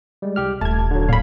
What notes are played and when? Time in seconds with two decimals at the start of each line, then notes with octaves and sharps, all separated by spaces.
0.22 G3 G#3
0.36 C2 G4 F6
0.61 D#1 A3 A5 G#6
0.91 D3 F#3
1.09 A#2 F5 B5